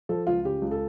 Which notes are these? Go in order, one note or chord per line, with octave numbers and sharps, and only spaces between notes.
F3 A4
C#2 F4
C#3 G4
C#2
A4